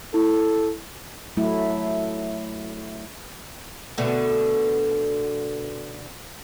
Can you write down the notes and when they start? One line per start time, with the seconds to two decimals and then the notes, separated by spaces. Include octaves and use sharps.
0.14 E4 A4
1.37 F#3 A3 E4
3.98 B2 D3 A3